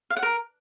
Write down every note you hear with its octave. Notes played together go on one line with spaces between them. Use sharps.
F5
F#5
A#4